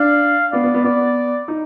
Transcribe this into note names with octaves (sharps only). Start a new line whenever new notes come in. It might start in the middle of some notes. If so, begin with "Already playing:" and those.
Already playing: D4 F5
B3 D5
B3
B3
B3 D5
D#4